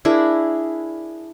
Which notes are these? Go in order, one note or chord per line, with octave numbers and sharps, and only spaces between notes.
D4 E4 G#4 A#4